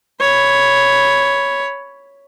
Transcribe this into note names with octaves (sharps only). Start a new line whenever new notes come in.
C#5 B5